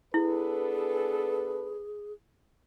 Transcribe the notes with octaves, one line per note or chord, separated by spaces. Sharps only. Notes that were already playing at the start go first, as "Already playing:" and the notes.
B3 D4 E4 G#4 A4 B4